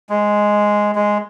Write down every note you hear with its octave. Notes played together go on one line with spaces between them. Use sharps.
G#3
G#3